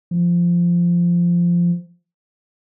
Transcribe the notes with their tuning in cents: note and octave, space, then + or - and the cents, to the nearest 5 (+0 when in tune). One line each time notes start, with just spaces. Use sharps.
F3 -10